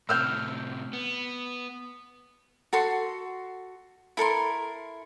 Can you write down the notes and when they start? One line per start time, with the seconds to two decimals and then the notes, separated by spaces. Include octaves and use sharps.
0.09 A2 C3 E6 F6 G6
0.93 B3
2.73 F#4 A4 C6
4.17 E4 A4 A#4 C6